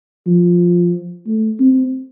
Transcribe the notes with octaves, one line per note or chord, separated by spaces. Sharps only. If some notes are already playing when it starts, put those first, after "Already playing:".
F3
A3
C4